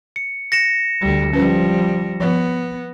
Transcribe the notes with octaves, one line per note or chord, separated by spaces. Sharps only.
C#7
A#6 C#7 E7
D2 G3
F3 G3 C#4 B4
F3 B3